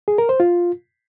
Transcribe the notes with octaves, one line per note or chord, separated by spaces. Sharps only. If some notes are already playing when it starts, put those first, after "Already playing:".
G#4
A#4
C5
F4